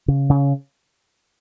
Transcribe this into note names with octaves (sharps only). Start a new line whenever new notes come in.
C#3
C#3